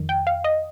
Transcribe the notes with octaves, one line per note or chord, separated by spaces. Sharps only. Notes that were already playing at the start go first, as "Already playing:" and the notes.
Already playing: F2 D#3
G5
F5
D#5